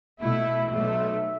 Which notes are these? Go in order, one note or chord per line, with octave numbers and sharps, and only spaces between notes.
B2 A3 E4 E5
B1 B2 A3